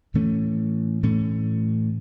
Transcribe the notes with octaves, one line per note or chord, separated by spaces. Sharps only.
A2 E3 A3 C#4
A2 E3 A3 C#4